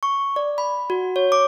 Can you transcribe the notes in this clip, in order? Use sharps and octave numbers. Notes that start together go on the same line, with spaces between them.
C#6
D5
B5
F#4
C#5
D6